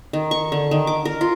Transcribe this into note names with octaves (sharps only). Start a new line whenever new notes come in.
D#3
C#6
D3
D#3
D6
A#4
F4